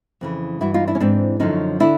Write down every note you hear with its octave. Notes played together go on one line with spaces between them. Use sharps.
F2 C#3 E3
G2 E3 E4 F#4
D#4 F4
D4 E4
C#4
G#2 E3 C4 D4
F#2 D3 F3 C#4 D#4
D3 D4 E4